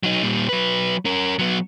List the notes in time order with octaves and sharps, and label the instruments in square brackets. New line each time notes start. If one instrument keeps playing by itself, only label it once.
[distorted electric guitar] F#3 D#4
A#2 G3
F#3 B4
C#4 A#4
F#3 B3